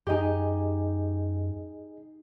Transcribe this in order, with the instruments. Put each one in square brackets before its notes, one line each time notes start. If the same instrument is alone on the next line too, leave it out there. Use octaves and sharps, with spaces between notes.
[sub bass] F#2 [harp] D#4 G4 [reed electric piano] G#4 D#5 G#5